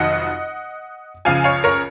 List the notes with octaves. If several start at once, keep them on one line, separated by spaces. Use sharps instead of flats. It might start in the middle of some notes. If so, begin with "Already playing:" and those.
Already playing: F1 F2 D#3 F#3 D#5 F#5
C#2 C#3 F3 F5 G#5
C#5 F5
A#4 C#5